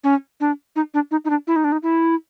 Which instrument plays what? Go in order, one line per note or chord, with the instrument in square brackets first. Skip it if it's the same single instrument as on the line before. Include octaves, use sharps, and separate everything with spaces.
[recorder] C#4
D4
D#4
D4
D#4
D#4
D4
E4
D#4
D4
D#4
E4